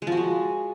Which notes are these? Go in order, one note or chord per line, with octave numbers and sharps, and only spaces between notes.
G#3
F3
F#4
G#3